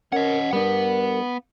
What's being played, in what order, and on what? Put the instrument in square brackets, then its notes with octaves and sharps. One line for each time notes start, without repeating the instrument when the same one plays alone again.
[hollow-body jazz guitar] C#4 [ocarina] A#4 [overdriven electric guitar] D#5 F#5
[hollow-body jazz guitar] G3 D4 [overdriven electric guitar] B3 [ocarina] A#4